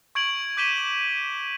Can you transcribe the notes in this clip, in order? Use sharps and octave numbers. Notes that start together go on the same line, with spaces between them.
C#6 G#6 D7 F#7
D6 G6 B6 D#7 E7 G7